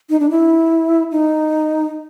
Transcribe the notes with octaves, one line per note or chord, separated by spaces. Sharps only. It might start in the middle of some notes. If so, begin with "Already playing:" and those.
D#4
D4
E4
D#4